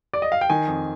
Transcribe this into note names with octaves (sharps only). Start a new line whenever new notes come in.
D5
D#5
F5
G5
D#3 G#5
F2